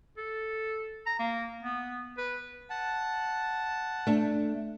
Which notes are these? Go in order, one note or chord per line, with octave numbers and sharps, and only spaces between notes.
A4
A#5
A#3
B3
B4
F#5 A5
A3 D4